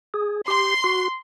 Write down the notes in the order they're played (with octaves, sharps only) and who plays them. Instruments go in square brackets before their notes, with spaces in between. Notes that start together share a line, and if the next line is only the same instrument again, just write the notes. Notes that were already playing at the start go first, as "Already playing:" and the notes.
[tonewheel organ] G#4
[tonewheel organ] G4 [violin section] C6
[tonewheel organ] F#4